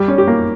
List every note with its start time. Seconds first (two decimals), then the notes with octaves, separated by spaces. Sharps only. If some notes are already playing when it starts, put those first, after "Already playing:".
Already playing: G3 G4
0.08 C#4
0.18 G4
0.28 A#3